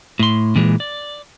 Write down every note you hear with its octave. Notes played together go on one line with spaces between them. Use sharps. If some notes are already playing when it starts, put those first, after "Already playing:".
A2 C6
A#2 E3 G#3
D5